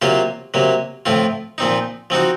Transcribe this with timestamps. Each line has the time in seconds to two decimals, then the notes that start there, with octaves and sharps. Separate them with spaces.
0.02 C3 F#3 A#3 F4 C5
0.54 C3 F#3 A#3
1.06 A2 F3 C4 F4
1.58 A#2 F3 C4 D#4
2.10 F3 C4 D#4 F#4